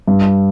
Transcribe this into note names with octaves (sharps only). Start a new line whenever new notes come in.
G2